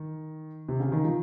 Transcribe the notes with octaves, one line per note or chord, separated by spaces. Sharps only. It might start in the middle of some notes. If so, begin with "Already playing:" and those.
Already playing: D#3
C3
C#3
D#3
F3